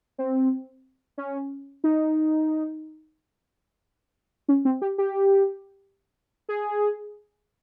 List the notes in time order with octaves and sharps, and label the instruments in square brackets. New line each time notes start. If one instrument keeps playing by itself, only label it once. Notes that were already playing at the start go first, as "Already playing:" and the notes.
[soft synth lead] C4
C#4
D#4
C#4
C4
G4
G4
G#4